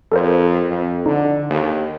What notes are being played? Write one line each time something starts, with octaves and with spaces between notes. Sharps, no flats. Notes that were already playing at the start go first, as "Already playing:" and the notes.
F2 A4 A#4 C5
F2
D3 D#4
D#2